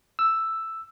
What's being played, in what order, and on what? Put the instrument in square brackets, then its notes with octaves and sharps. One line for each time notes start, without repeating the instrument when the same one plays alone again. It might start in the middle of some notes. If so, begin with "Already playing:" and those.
[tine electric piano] E6